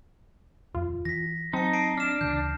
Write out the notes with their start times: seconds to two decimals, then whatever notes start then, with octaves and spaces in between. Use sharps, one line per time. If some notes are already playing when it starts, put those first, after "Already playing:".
0.74 D#1 F2 F4
1.05 E3 A#6 B6
1.53 F#3 C4 D#4 A5 C#7
1.73 A5 C7 D7
1.97 D4 F6 E7
2.21 D2 C#3 E3 G6